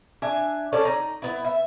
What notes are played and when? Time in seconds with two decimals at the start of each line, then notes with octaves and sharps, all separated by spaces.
0.22 D4 E5 G#5
0.72 G3 C#4 A4 D5
0.85 D#4
1.22 B3 E4
1.45 E5